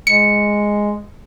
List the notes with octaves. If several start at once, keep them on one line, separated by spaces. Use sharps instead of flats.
G#3 C#7